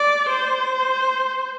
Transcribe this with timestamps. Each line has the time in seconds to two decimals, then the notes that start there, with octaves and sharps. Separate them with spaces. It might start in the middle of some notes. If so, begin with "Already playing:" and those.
Already playing: D5
0.29 C5